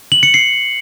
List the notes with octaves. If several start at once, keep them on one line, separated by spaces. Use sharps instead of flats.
F#7
C#7
C7